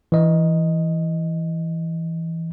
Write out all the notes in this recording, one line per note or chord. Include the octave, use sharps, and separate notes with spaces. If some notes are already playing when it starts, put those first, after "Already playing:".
E3 D#5